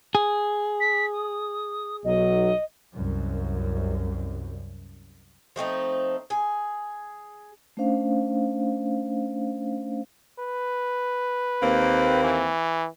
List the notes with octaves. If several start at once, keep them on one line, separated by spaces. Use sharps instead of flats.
G#4
B6
D#6
B1 F#3 D#5
C2 F#2
F3 A3 C4 D#4
G#4
A3 C#4 D4 C5 F5
B4
D#2 A#3 C4
E3